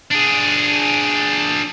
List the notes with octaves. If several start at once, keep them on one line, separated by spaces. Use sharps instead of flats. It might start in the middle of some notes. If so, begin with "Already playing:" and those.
D4 G#4